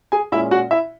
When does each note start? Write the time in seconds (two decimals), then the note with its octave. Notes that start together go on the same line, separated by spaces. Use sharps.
0.12 G#4 G#5
0.32 A#2 G#3 C#4 E4 E5
0.51 F#4 F#5
0.71 E4 E5